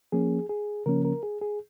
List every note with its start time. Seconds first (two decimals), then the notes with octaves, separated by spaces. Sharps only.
0.12 F3 A#3 C#4 G#4
0.49 G#4
0.86 C#3 F3 A#3 C#4 A#4
1.05 A#4
1.23 G#4
1.41 G#4